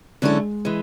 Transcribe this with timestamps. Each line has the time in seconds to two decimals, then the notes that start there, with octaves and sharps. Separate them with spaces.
0.22 D3 F#3 G#3 C#4 E4 A4
0.65 E3 G#3